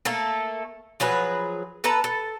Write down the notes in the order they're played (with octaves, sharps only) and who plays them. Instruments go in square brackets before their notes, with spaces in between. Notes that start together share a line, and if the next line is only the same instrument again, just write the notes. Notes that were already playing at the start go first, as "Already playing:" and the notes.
[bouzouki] A3 A#3 A4
F3 F#3 G#4 B4
A4 B4 A5 A#5
A4